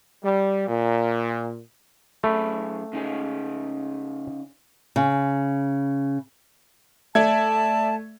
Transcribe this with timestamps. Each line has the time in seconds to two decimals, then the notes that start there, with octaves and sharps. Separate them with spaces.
0.23 G3
0.67 A#2
2.24 F#2 A3 G#4 B5
2.93 C#3 D#4 G#4
4.96 C#3
7.15 A3 D5 E5 A5 G#6